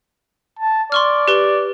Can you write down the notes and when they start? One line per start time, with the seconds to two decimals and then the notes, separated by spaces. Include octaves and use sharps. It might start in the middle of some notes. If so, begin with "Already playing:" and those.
0.59 A5
0.92 D5 C6 C#6 F6
1.28 G4 B4 G7